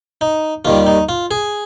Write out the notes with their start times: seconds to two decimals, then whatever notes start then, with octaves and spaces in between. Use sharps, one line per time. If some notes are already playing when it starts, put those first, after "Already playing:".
0.21 D#4
0.65 D#2 D#3 G3 F4
0.87 D#4
1.09 F4
1.31 G#4